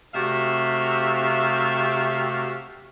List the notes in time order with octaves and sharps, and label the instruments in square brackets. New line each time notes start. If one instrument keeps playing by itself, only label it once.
[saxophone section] C3 A3 F#4 G4 E5 F5